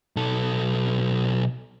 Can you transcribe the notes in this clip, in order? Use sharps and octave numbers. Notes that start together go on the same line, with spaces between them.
B1 A4